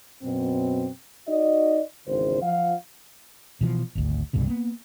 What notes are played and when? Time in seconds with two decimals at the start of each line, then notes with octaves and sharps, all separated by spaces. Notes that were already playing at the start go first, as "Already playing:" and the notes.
0.22 F#2 B2 C4
1.27 D#4 F#4 D5 D#5
2.07 G#1 E2 G#2 C#3 C5
2.42 F3 F5 F#5
3.61 B2 E3 F3
3.95 G#1 D2
4.33 C2 G2 B2 D3
4.47 A#3 B3